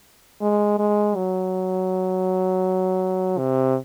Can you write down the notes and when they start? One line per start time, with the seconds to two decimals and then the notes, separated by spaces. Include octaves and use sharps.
0.41 G#3
0.79 G#3
1.16 F#3
3.38 C3